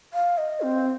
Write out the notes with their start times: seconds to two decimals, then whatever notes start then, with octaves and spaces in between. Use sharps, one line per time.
0.13 F5
0.38 D#5
0.62 C4